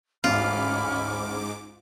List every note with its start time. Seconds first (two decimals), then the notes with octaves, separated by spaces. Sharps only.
0.24 A1 D2 G#2 C#4 F4 B5 D6 F6